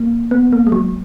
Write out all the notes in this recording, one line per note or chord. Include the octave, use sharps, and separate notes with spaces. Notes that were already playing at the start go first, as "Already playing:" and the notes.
Already playing: A#3
B3
A#3
G#3
F#3